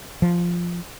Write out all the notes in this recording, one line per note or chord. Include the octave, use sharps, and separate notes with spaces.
F3